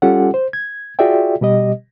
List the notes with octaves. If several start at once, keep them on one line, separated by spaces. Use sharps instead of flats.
G3 C#4 F4 G4 A4 F#5
C5
G#6
F4 F#4 G#4 D5 E5 G5
B2 G3 G4 D#5